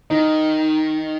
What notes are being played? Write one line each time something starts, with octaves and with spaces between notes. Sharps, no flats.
D#3 D#4